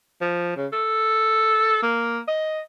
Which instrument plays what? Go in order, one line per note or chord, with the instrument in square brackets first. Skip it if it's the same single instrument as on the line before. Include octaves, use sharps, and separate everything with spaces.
[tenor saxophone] F3
C#3
A4
A#3
D#5